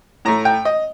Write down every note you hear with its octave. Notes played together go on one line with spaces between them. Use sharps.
A2 A3 A#5
G5
D#5